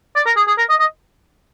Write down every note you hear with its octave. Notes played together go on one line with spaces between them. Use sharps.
D5
A#4
G#4
G#4
A#4
D#5
D#5